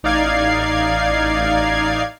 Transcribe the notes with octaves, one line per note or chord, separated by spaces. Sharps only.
A1 D#4 D5 F5 G#6 C7